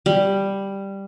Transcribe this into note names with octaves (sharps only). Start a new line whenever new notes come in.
G3